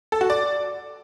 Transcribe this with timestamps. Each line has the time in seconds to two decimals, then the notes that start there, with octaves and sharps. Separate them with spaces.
0.12 A4
0.21 F#4
0.30 D5